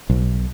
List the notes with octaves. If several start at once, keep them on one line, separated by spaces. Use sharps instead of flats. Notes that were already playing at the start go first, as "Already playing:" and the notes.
B1